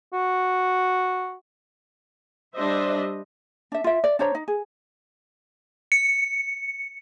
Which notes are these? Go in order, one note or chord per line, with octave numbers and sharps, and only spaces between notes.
F#4
G3 D4 C5 D#5 E5
D4 E5
F4 E5
D5
D4 C5 C#5 A#5
D#4
G#4
C#7